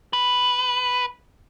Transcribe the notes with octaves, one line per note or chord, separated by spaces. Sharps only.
B4